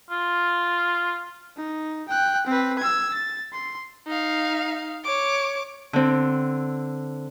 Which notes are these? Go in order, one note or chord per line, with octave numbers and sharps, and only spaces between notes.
F4
D#4
G5 F#6
C4 B4
E6 G#6
A6
C6
D#4 F5
C#5 D6
D3 C4